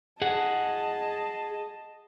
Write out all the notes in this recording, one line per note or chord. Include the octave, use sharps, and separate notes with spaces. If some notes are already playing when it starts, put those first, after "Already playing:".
G#4 D#5 F#5 A5